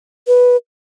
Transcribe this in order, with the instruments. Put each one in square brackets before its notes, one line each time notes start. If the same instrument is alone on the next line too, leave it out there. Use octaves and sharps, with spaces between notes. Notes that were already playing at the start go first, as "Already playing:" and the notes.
[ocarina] B4